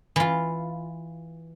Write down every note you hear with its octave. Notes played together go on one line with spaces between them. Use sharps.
E3 F4